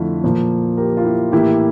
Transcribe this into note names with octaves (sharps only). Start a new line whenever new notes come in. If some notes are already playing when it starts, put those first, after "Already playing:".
Already playing: F2 D3 A3 D4 E4 F4
A#2 F3 A#3
G4 A#4
F4
E4 G4
A2 E3 A#3 E4 G4